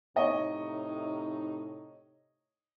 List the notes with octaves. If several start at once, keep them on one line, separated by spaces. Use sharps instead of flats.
A2 C3 D#4 C#5 D#5